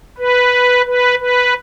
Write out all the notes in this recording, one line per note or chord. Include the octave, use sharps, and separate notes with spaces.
B4
B4
B4